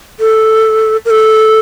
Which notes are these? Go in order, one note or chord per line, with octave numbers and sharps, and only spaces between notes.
A4
A#4
A4